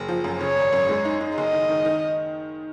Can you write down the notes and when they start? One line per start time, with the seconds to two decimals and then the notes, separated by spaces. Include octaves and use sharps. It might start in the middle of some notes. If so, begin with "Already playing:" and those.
Already playing: F#1
0.08 F3
0.24 F#2
0.41 C#3 C#5
0.56 G#1
0.73 F#2
0.89 G#3
1.05 D#4
1.21 D#4
1.37 F#1 D#5
1.53 D#3
1.70 D#3
1.85 D#3